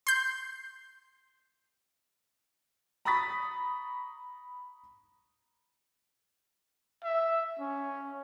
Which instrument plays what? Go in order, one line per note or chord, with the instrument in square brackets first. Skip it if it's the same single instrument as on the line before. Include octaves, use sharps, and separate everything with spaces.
[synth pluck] C6 G6
[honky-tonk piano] A#5 B5 C#6 D#6 A6 B6
[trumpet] E5
C#4